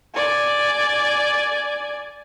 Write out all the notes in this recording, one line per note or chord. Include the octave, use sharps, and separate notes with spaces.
D5 G#5